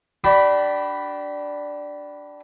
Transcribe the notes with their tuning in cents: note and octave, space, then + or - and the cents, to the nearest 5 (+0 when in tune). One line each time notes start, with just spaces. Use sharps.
D4 +0 G4 -40 B5 +0